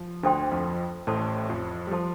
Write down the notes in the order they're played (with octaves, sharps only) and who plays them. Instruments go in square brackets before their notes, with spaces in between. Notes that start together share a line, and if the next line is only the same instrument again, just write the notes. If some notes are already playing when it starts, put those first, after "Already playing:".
Already playing: [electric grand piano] F3
[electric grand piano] D2 D3 [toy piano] D4 A4 C5 G5 C6
[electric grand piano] F2 F3
[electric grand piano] A1 A2 [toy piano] A4 C5 A5 C6
[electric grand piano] F2 F3
G3
[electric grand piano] F3 [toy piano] A4 C5 A5 C6